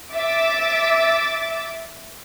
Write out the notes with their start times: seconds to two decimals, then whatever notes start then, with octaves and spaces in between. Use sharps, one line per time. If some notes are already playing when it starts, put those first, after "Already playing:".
0.13 E5 D6 A6